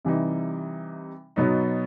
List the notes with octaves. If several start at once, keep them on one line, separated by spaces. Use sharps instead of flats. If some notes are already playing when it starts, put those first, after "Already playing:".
C3 E3 G3 D#4
B2 F#3 B3 D#4